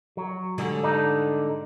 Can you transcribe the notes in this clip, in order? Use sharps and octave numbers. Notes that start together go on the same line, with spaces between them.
F#3
G#2 D3 G3
D4 D#4